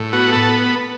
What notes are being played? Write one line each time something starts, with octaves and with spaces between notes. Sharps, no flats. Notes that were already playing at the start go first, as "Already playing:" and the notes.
Already playing: A2
B3 F#4
A4